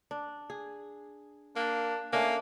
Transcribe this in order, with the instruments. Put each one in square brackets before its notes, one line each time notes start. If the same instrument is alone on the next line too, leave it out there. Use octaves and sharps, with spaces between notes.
[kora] D4
G#4
[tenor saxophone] A#3 [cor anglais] D4
[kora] A3 C#4 D4 [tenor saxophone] A#3 [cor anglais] G#5